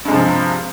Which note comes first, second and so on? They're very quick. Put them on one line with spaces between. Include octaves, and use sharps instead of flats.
G2 G#3 C3 F3